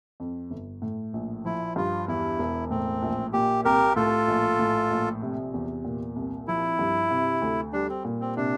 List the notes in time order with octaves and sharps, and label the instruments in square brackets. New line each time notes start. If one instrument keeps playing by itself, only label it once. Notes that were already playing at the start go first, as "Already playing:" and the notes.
[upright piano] F2
G1
A2
A#1
[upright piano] F3 [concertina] E4
[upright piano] G2 [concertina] F4
[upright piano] E2 [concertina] E4
[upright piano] E1
[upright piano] A2 [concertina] C4
[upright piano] A#1
[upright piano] A#2 [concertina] G4
[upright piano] C2 [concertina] G4 A#4
[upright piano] A2 [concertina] F4 A4
[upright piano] A#1
A2
A#1
C3
E2
A#2
C2
[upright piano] F3 [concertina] E4
[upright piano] G2
C3
D2
[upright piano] G3 [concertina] D4
[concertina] C4
[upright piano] A#2
[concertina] C4
[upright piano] C3 [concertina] D4